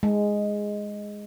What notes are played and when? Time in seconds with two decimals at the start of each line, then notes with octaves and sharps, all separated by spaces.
0.03 G#3